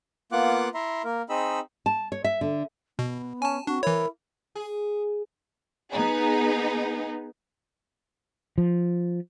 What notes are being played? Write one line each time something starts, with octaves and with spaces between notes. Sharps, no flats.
A#3 B3 F4 F#5 D6 F#6
E4 E5 A#5 C6
A#3 A#4
C4 D#4 G#4 D#5 B5 E6
A5
C#5
E5
D3
B2 B3
C#4 G#5 A5
C4 D4 F#4
E3 E4 A#4 C#5
G#4
B3 D#4 G#4
F3